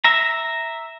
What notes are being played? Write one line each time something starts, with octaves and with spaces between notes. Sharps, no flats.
E5 A#5